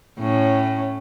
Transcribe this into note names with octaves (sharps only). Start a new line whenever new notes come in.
A2 C#4